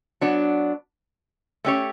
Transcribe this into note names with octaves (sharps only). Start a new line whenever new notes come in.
F#3 B3 D4
A3 C#4 G4 C#5